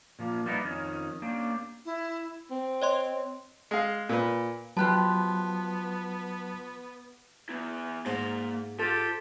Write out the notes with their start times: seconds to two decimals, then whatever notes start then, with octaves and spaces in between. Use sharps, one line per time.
0.19 A#2 F3 A#3
0.46 G3 A#3 B3 D#4 E4
0.64 F2 D#3 C#4
1.22 A#3 C#4 D4 G4
1.85 E4
2.51 C4
2.82 C#5 D#5 C6
3.71 G#3 F5
4.09 A#2 B4
4.77 F3 F#3 B3 G4 B4 A5 F#6
7.49 B3 E4
8.06 G#2 A#3 C6
8.79 F4 G4 A4